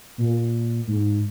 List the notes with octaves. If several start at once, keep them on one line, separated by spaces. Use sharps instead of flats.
A#2
G#2